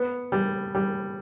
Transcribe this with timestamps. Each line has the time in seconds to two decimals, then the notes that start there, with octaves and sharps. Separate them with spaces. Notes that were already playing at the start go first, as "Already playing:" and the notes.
Already playing: B3
0.32 G3
0.75 G3